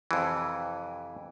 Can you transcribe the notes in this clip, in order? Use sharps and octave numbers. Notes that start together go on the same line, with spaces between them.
F2 C3 E3